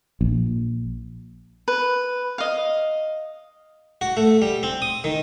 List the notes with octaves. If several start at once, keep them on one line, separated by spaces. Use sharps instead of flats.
A#1
B4
D#5 F5
F#4
A3
G3
C4
D#6
D#3